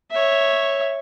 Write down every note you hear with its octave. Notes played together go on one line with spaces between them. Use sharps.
C#5 E5